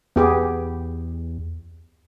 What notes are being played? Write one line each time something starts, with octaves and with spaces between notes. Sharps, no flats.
E2 B3 G4 G#4